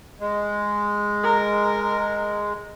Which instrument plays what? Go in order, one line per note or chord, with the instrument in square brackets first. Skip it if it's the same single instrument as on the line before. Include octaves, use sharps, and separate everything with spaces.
[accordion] G#3
[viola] A#4